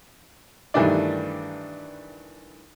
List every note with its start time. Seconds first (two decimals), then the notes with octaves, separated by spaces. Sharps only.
0.74 G2 D#3 E3 A3 D4 D5